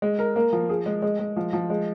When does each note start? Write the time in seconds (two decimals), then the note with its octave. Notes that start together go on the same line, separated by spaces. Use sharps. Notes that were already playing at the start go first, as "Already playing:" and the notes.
0.02 G#3
0.19 A#4
0.36 A#3
0.53 F3
0.69 G#4
0.86 G#3
1.02 G#3
1.19 G#3
1.37 F3
1.53 F3
1.70 G#3